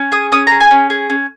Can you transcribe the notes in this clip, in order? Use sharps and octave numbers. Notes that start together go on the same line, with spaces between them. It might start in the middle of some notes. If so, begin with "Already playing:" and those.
Already playing: C#4
G#4 D#6
C#4 D#6
G#4 A#5
G#5
C#4
G#4
C#4